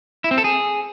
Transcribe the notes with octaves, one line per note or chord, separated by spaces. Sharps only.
E4
C4
A4
G#4